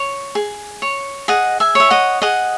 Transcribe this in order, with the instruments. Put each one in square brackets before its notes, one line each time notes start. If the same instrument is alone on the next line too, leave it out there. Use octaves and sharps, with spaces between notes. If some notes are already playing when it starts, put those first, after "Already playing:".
Already playing: [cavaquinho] C#5
G#4
C#5
G#4 D#5 F#5
E5 G#5
C#5 E5
D#5 F#5
G#4 D#5 F#5